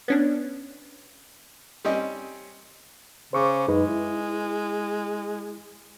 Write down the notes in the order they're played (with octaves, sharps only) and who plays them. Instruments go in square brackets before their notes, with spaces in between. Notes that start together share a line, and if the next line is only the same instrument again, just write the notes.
[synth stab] B3 C#4 D4
[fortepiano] G3 C4 C#4 D#4 D#5
[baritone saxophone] C#3 [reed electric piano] C5 C#6 D6
[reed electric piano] F#2 D#4 B4 [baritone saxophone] G#3
[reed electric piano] E4